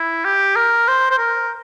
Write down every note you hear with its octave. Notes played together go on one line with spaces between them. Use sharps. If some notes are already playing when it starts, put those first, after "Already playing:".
Already playing: E4
G4
A#4
C5
C5
A#4